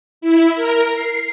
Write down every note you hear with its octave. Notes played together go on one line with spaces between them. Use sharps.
E4
A#4
C7